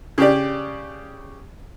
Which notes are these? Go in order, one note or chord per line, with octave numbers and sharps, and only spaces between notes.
C#3 G4 D5